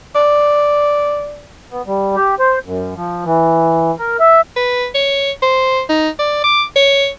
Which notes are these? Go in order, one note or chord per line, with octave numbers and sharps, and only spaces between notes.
D5
B3
G3
G4
C5
F#2
F3
E3
A#4
E5
B4
C#5
C5
D#4
D5
D6
C#5